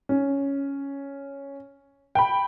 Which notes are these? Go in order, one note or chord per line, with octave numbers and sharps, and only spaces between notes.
C#4
G5 B5